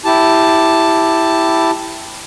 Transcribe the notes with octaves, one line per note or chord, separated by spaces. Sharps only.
E4 G4 A5